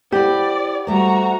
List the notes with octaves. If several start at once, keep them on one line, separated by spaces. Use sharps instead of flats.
E4 G4 C5 D5 F#5
G3 A3 F#4 C5 A#5